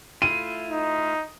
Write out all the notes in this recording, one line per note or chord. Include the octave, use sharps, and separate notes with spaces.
A3 E4 F4 D#7
D#4